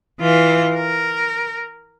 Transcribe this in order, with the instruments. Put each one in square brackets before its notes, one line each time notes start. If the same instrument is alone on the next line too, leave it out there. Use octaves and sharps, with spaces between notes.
[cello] E3 F4
A#4